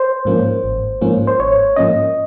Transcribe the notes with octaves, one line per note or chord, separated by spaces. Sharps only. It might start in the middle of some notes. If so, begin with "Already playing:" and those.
Already playing: C5
G#2 F3 A#3 C#4
G#1
G#2 F3 A#3 C#4
C5
G#1 C#5
G#2 F3 A#3 C#4 D#5